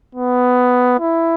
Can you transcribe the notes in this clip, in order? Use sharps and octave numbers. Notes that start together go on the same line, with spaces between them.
B3
E4